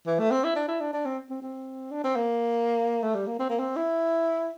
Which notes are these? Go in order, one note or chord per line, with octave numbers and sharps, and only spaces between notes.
E3
A3
C4
E4
D4
E4
D4
D4
C4
C4
C4
D4
C4
A#3
A3
G3
A#3
C4
A#3
C4
E4